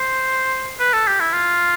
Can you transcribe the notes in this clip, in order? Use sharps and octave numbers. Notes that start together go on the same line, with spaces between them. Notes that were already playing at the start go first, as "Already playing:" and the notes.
Already playing: C5
B4
A4
G4
E4
F4